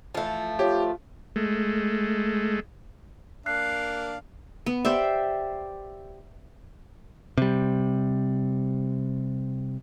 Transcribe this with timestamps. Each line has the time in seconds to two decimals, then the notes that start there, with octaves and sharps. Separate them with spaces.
0.15 E3 F3 A3 F4
0.59 F4 G4 C5 C#5
1.36 G#3 A3
3.46 A#3 D4 F5 F#6 C7
4.66 B3
4.85 G4 C5 D5 E5
7.38 C3 G3